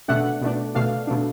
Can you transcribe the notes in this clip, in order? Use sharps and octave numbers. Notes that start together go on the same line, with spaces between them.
B2 A3 D4 F#5
B2 A3 D4
B2 A3 D4 F5
B2 A3 D4